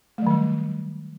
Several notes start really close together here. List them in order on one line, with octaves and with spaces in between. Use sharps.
A3 F#3 D#3 G3